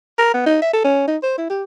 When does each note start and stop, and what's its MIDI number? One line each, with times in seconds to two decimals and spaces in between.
0.18 0.33 70
0.34 0.45 59
0.46 0.58 63
0.62 0.70 76
0.73 0.82 69
0.85 1.06 61
1.08 1.17 63
1.23 1.33 72
1.38 1.45 64
1.50 1.63 67